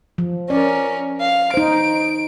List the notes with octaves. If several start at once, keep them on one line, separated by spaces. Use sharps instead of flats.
F3
C#4 A#4 D5
F5
D#4 C5 D7